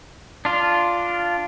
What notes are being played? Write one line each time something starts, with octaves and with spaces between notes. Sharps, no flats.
D4 F4